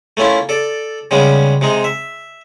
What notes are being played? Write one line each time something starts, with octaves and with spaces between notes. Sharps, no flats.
A3 A#3 C#4 E4 F4
A4 D5
C#3 G3 G#3 B3 C#4
C3 G#3 D#4
E5